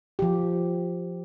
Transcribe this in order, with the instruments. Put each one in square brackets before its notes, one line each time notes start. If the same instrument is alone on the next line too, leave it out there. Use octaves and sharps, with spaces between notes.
[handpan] F3 G4